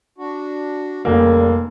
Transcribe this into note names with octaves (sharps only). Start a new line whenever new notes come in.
D4 F#4
F1 A#2 C#3 G3 A#3